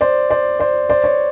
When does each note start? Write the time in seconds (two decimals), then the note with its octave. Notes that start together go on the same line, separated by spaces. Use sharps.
0.01 C5 D5
0.30 C5 D5
0.60 C5 D5
0.90 C5 D5
1.04 C#5